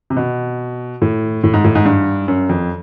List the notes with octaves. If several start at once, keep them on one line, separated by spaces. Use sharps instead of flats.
C3
B2
A2
A2
G#2
A2
G#2
G2
F#2
F2